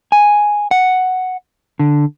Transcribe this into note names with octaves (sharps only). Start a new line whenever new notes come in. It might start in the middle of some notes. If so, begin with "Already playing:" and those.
G#5
F#5
D3